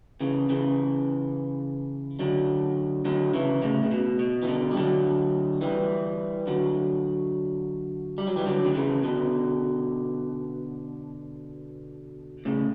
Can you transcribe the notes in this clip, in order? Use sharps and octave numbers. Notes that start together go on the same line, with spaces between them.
C#3 E3
C#3 E3
D3 F#3
D3 F#3
C#3 E3
A2 C#3
C#3
B2
B2
E3
B2 D3
G3
D3 F#3
E3 G3
D3 F#3
G3
F#3
E3 G3
D3 F#3
D3
C#3 E3
B2 D3
A2 C#3